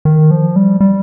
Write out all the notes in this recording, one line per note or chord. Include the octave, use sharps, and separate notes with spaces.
D#3
F3
G3
G3